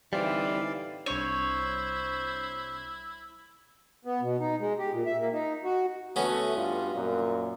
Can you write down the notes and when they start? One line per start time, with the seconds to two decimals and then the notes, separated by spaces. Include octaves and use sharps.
0.13 A2 D3 E3 G3 C4 D#4 D5 F5
1.06 C2 D4 E4 C5 C#5
4.05 B3
4.21 B2
4.40 D#4
4.60 G#3
4.79 G4
4.92 A#2
5.06 E5
5.19 A#3
5.33 D#4
5.64 F#4
6.16 D2 A3 B3 C#4 F#4
6.56 G2 F4
6.95 F#2 A#2